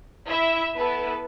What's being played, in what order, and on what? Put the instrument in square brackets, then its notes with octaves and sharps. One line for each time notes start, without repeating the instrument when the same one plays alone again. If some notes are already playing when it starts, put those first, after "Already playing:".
[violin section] E4 E5
B3 E4 A4 B4